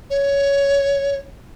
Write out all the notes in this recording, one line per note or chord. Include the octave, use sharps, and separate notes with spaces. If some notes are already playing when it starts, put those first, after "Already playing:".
C#5